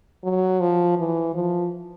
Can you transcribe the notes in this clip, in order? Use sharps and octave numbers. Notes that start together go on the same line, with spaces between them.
F#3
F3
E3
F3